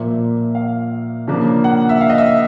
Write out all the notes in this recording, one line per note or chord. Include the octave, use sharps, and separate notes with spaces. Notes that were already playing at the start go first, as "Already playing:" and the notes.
Already playing: A#2 F3 A#3 E5
F5
C#3 F3 A#3 D4
F#5
E5
F5
D#5
E5